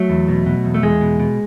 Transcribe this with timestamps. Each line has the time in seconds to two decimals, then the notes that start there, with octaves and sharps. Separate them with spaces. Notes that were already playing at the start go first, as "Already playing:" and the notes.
Already playing: F#3 A3
0.10 E2
0.29 B2
0.46 B2
0.65 E2
0.74 A3
0.83 E2 G#3
1.01 B2
1.20 B2